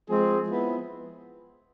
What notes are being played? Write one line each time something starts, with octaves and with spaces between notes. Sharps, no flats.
F3 G#3 C4 G#4
F3 B3 E4